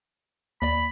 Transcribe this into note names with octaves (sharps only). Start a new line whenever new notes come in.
D#2 D5 B5